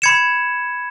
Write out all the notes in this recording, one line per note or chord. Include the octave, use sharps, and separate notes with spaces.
B5 G#6 C#7 E7